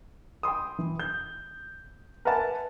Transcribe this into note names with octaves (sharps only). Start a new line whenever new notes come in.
G5 B5 C6 D#6
E3
G6
A#4 B4 E5 F#5 G#5 A5